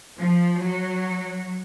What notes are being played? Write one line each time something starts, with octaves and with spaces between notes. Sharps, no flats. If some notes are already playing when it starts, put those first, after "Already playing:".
F3
F#3